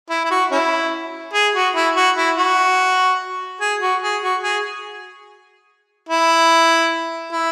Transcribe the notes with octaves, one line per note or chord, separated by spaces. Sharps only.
E4
E4
F#4
C#4 E4
G#4
F#4
E4
F#4
E4
F#4
G#4
F#4
G#4
F#4
G#4
E4
E4